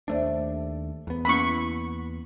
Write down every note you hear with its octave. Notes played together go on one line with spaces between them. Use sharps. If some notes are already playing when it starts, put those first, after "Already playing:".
D#2 A3 D4 C5 D5 E5
E2 B3
A#3 C#4 E4 B5 C#6